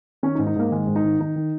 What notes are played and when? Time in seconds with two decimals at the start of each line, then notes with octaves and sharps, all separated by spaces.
0.23 D#3 C#4
0.35 D#4
0.39 G#2
0.46 D#4
0.56 G#2 A#3
0.71 D#3 G#3
0.87 G#2
0.96 D#4
1.04 D#3
1.19 D#3 D#4
1.36 D#3